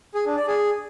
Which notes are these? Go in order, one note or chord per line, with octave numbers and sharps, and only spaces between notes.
G#4
D4
D5
G#4